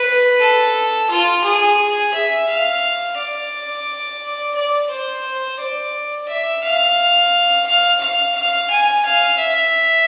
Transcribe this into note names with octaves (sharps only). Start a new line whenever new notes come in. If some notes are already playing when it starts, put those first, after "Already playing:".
Already playing: B4
A4
F4
G#4
E5
F5
D5
D5
C5
D5
E5
F5
F5
F5
F5
G#5
F5
E5